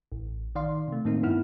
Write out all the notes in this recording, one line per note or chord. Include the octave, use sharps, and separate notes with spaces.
A1
D#3 D5 F5 C6
C3 A3
A2 D#3 A#3 C4 D#4
G2 B3 E4 F#5 F6